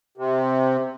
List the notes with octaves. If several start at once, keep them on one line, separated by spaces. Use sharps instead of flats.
C3